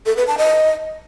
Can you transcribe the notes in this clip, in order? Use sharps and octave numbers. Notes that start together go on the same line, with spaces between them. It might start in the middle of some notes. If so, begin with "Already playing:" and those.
A4
B4
A5
D#5